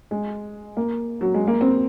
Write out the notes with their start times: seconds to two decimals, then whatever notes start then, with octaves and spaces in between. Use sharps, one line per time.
0.11 G#3
0.77 A#3
1.21 F#3
1.34 G#3
1.47 A#3
1.61 C4